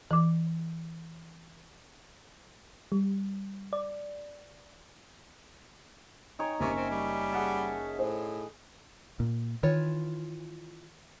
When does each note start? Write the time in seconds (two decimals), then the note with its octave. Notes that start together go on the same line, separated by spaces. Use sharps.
0.11 E3 D6
2.92 G3
3.73 D5
6.39 D#4 C#5 G5 G#5
6.60 F#1 C3 C#4 E5 C#6
6.77 C4
6.91 G3
7.33 G#4 F#5 A5
7.99 A2 C5
9.20 A#2
9.63 D#3 E3 F4 C#5